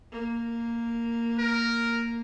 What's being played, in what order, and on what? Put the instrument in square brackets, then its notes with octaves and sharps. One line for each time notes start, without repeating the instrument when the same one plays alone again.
[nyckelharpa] A#3
[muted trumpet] A#4